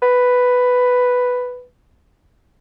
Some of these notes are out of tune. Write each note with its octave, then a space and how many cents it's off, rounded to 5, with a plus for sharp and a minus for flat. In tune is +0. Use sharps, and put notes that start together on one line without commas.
B4 +5